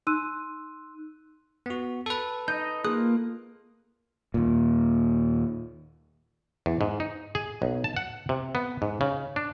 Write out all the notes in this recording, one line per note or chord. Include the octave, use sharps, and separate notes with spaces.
D#4 C6 E6 F#6 D#7
B3 F#4
A4 B4
D#4 D#5 G6
A#3 F4 G#4 D#6 F#6
D#2 A#2
E2
G#2
D#4
G#4
B1
A5
F#5
C3
B3
G#2
C#3
D4